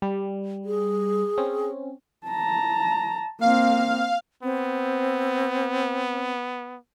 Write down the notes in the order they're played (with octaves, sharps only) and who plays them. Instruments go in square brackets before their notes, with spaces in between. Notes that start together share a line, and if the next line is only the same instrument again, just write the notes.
[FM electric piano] G3
[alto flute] G#4
[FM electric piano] C4 C#4
[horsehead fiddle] A5 A#5
[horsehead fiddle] A#3 C4 [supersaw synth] F5
[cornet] B3 [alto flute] C4